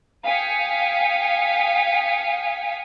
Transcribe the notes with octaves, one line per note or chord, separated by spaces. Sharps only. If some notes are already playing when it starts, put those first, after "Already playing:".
F5 G5 G#5 D#6 B6 C#7